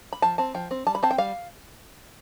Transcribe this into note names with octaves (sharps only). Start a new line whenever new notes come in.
B5
F3 A5
C4 A5
F3 G5
C4
G3 A5
B5
C4 A5
G5
G3 F5